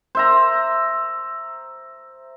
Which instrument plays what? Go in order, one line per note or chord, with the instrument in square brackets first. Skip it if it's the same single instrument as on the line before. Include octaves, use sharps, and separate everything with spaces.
[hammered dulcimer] C5 E5 A#5